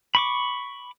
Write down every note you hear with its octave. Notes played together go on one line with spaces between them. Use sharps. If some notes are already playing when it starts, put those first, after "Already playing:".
B5 C#6 D6